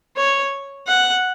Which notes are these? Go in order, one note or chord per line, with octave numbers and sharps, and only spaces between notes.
C#5
F#5